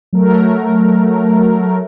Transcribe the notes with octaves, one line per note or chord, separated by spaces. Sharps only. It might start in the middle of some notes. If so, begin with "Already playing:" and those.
F#3 A3 A#4